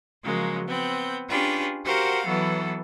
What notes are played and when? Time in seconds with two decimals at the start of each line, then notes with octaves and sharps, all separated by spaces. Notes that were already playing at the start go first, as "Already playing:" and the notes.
0.24 C#3 F3 F#3 G#3 A#3
0.66 B3 C4 G6
1.29 C#4 D4 F4 G4 G#4 B4
1.85 F#4 G4 A#4 C5 F5 F#5
2.26 E3 F#3 B3 A4